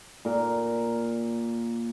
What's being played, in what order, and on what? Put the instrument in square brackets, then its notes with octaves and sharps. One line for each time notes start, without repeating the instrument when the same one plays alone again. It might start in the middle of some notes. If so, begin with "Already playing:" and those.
[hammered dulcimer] A#2 A#4